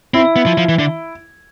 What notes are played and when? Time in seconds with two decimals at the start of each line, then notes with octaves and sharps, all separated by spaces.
0.14 C4 E4
0.36 B3
0.46 F3
0.58 F3
0.69 E3
0.79 D3